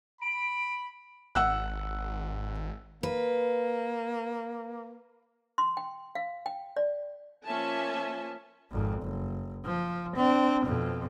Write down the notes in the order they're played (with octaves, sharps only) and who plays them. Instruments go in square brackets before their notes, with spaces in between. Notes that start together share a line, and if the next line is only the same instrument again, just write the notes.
[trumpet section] B5 [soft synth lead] D7
[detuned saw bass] G#1 [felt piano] F#5 E6 F#6
[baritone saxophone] A#3 [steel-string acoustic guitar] B4
[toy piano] C6
G5
F5
G5
D5
[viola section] F3 A#3 C#4 E5 G#5 A5
[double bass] G#1 F2
F#1
F3
C4 D4
F2 B2